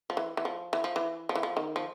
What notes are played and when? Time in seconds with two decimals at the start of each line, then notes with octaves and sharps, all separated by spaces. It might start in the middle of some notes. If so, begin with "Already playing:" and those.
0.10 F3
0.17 E3
0.37 E3
0.45 F3
0.73 E3
0.84 F3
0.96 E3
1.29 F3
1.35 E3
1.43 F3
1.57 D#3
1.76 F3